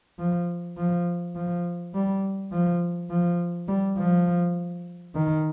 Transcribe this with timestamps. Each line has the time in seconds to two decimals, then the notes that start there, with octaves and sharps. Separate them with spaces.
0.19 F3
0.77 F3
1.36 F3
1.94 G3
2.52 F3
3.10 F3
3.68 G3
3.97 F3
5.15 D#3